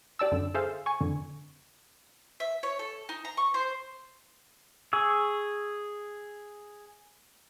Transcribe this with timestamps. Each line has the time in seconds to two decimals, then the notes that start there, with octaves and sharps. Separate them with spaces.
0.19 G4 D5 A5 E6
0.32 F#2 D3
0.54 G#4 A4 C5 E5 F5
0.86 G#5 C#6
1.01 F2 D3
2.40 E5
2.63 C#5
2.79 A4
3.09 D#4
3.25 A#5
3.37 C#6
3.54 C5
4.93 G#4 C#6 E6